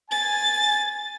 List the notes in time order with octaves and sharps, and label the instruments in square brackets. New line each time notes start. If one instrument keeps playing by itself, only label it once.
[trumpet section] G#5 [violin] A6